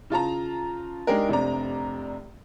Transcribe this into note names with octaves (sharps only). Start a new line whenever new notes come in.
C#3 F4 A5 A#5
G#3 D4 D#4 G4 G#4 A#4
F1 C3 D4 D5 A#5